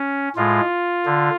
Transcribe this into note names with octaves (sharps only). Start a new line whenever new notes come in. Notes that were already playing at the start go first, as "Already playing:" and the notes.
Already playing: C#4
A2 G#3 F4
D3